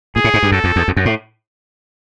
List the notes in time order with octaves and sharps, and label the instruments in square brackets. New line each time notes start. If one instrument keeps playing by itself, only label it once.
[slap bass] A#2 [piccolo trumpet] G#4
[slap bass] A2
G#2
G2
[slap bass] F#2 [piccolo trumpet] A4
[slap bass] F2
E2
F2
F#2
A2